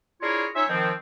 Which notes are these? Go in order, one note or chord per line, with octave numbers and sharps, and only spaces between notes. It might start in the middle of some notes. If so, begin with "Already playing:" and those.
D4 E4 F4 G#4 A#4 C#5
C#4 D#4 F4 C#5 E5
D#3 F3 C4